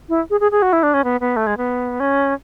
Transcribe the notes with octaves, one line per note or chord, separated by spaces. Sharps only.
E4
G#4
G#4
G#4
F#4
E4
D4
C#4
B3
B3
A3
G#3
B3
C#4